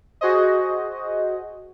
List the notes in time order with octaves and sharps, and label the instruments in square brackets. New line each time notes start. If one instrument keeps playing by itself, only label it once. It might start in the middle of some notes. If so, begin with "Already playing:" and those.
[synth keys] F#4 G#4 C5 D#5